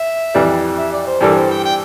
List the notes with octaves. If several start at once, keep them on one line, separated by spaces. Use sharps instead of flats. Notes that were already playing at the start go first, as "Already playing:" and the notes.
Already playing: E5
F2 E3 G3
E5
D5
C5
G2 E3 G3 D4 A4 A#4
A#4
C5
G5
G5